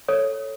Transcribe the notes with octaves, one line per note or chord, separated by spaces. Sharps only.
A4 C#5